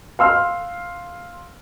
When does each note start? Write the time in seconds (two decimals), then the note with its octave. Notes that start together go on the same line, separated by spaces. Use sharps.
0.19 F5 C6 E6 F6